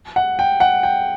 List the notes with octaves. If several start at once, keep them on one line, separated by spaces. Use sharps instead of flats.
F#5
G5
F#5
G5